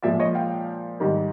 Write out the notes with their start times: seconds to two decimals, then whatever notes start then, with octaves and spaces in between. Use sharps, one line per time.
0.03 A#2 F3 G#3 D5 E5
0.20 C#5 D#5
0.35 F5 G5
1.00 G#2 D#3 G3